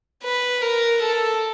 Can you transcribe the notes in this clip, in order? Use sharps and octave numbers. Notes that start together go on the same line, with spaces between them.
B4
A#4
A4